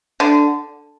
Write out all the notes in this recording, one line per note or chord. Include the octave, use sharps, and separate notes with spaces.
D3